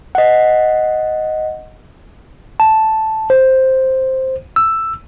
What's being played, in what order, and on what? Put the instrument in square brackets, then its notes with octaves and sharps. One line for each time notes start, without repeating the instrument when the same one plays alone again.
[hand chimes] D#5 F#5
[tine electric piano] A5
C5
E6